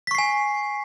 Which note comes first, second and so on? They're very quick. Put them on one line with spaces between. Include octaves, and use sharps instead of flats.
B6 C#6 C7 G#5